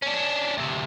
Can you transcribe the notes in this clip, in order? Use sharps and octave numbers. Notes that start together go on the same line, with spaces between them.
C#4 D4
D2 C3